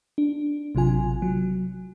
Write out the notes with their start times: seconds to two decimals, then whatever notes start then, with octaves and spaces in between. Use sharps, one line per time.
0.18 D4
0.75 A1 C3 F#3 F4 G#5
1.22 F#3